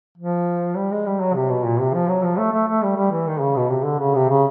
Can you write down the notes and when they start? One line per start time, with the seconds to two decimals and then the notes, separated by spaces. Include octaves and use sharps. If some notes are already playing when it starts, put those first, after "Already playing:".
0.18 F3
0.76 G3
0.91 G#3
1.06 G3
1.21 F#3
1.35 C3
1.50 B2
1.65 A#2
1.80 C3
1.94 F3
2.08 F#3
2.23 F3
2.38 A3
2.53 A3
2.68 A3
2.83 G3
2.96 G3
3.11 E3
3.27 D#3
3.41 C#3
3.57 B2
3.71 C3
3.85 D3
4.00 C#3
4.15 C3
4.29 C#3